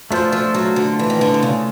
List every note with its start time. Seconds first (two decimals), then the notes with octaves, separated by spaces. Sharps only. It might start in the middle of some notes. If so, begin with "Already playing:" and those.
0.11 F3 A3 D4 F4 A4 C5
0.32 F3
0.54 F#3
0.76 D3
0.99 E3
1.10 D#3
1.21 D3
1.34 C3
1.43 C#3